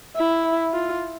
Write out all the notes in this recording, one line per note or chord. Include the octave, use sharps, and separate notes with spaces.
E4
F4